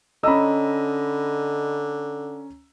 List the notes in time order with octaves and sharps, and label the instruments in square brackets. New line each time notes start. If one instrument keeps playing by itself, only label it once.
[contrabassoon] D3 [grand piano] C#4 A#5 E6 [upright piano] D#5 B5